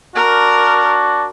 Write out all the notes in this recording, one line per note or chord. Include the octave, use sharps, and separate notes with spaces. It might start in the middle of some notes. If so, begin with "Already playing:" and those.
D4 F#4 A#4